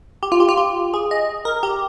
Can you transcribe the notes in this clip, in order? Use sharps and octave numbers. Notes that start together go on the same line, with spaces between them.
G4
F4
G4
F4
G4
G#4
D#5
A#4
G4